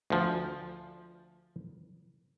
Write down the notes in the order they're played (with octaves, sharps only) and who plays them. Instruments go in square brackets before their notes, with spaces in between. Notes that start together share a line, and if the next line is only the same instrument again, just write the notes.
[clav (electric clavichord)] D2 F3